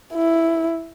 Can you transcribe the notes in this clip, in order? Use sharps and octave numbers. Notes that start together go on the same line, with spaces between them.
E4